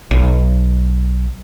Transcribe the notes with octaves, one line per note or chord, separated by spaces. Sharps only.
B1